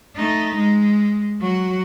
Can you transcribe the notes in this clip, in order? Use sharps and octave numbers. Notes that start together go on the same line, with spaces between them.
A3 D#4
G#3
F#3 F#4